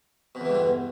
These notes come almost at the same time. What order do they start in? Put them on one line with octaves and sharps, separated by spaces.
B2 E2 E3 G2 D3